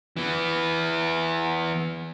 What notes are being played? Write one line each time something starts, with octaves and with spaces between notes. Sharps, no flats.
E3 B3